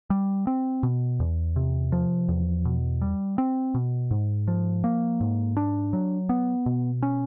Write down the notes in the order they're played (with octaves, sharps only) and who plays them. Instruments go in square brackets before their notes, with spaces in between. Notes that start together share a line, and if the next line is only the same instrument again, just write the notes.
[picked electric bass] G3
C4
B2
E2
C3
F3
E2
B2
G3
C4
B2
G#2
F3
A#3
G#2
D4
F#3
B3
B2
C#4